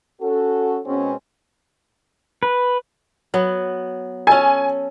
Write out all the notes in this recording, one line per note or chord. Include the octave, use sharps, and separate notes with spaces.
C#4 F#4 A4
B2 G#3 C4 C#4
B4
F#3 B3
C#4 A4 G#5